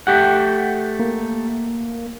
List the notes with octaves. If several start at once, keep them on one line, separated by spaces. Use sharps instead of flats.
A3 G4 F#5
A#3